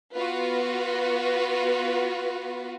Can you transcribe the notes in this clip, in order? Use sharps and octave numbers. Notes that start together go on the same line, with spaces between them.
B3 F4 F#4 B4